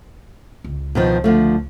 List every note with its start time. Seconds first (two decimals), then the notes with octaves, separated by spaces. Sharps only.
0.64 C#2
0.95 B2 D#3 F3
1.24 D3 F3 A3